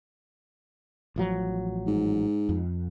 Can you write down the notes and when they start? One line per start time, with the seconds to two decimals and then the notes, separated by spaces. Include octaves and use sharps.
1.16 A1 F3 F#3
1.87 G#2
2.49 F2